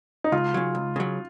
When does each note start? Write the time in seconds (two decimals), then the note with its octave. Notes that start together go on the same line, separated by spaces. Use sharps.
0.24 D#4
0.32 C#2 F4
0.54 C#3 F#3
0.75 C#2
0.96 C#3 F#3